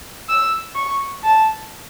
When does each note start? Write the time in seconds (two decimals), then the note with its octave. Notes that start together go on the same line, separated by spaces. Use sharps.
0.29 E6
0.76 C#6
1.24 A5